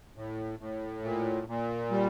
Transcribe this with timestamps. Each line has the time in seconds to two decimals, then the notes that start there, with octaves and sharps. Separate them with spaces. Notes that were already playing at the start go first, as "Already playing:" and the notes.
0.16 A2
0.59 A2
1.03 A#2
1.47 A#2
1.91 G3